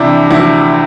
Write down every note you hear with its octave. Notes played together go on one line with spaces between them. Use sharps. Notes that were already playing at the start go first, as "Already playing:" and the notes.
Already playing: C3 E3 D4 E4 G4
D2 E4